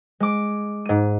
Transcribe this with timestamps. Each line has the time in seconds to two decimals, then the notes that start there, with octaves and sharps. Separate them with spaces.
0.20 G#3 D6
0.86 G#2 D#7